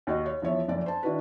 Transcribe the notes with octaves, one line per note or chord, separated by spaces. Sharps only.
D#2 F#4 D#5
C#5
E2 F3 C#5 E5
F#1 F2 D5
C5 A5
D#3 D4 E4 F#4 B4